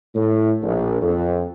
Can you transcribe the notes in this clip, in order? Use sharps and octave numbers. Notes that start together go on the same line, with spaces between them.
A2
A#1
F2